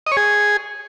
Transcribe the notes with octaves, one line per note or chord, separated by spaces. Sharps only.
D#5
C#5
G#4